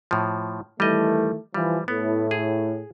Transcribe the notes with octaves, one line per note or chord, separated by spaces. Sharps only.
A2 F3
D#3 E3 G3 A3 D#5
E3 F3 G3
A2 B3
G#4